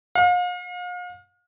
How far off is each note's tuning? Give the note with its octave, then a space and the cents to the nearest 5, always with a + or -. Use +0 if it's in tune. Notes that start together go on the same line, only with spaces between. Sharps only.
F5 +40